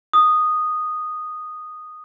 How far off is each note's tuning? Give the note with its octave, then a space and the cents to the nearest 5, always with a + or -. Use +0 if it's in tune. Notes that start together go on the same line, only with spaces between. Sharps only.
D#6 -10